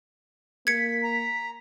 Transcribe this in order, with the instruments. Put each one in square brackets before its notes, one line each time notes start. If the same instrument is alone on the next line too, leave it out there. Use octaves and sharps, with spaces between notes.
[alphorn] A#3 [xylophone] G#6 C#7 [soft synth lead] B6
[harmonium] A#5